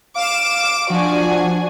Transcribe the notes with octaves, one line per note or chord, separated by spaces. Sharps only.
F5 D6 E7
F3 D4 F#4 G#5